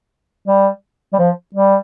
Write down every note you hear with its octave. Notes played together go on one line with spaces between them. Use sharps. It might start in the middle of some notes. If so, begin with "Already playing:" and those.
G3
G3
F3
G3